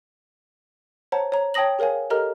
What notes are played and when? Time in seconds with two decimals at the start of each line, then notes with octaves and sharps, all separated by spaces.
1.12 C5 C#5 F#5 A5 A#5
1.32 C#5 A#5
1.54 C#5 G5 A5 D#6 A#6 F#7
1.79 G#4 A#4 C#5 F5 G#5
2.10 G4 A4 A#4 D#5 A#5 F6